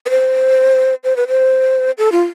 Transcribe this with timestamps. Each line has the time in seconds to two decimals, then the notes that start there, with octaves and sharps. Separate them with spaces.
0.06 B4
0.10 C5
1.04 C5
1.17 B4
1.28 C5
1.98 A4
2.12 F4